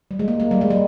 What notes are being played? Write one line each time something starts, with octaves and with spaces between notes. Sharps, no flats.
G3
G#3
A#3
A#3
G3
G#3
G3